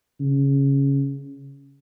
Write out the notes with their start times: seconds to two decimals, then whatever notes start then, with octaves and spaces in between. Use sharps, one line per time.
0.20 C#3